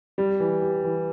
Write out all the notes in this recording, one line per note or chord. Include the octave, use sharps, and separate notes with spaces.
G3
E3
G4
E3